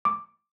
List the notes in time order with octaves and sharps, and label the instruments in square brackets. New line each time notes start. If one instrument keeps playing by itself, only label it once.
[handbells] D6